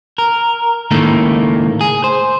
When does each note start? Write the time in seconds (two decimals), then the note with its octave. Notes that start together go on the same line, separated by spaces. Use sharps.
0.18 A#4
0.91 C#2 A2 D#3 A3 A#3
1.81 G#4
2.04 C5